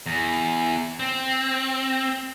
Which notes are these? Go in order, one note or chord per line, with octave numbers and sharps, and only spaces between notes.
E2
C4